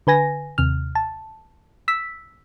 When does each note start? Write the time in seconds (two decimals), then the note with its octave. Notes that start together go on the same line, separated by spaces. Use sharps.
0.07 D3 B4 G#5 A#6
0.58 D#2 C3 F6
0.95 A5
1.88 E6 B6